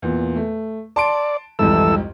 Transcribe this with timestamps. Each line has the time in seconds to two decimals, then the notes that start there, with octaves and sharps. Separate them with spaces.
0.02 E2 A#2
0.36 A3
0.96 D5 A5 C6 D7
1.59 C2 F2 G#2 E3 A4 E6